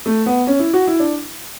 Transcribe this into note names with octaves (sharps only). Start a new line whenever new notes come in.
A3
B3
C#4
E4
F#4
E4
D4